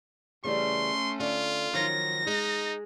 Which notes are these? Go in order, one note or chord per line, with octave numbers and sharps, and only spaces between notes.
C#3 E3 G3 A3 C#4 C6
D3 F4
D#3 F3 F#3 A#6
G#3 D#4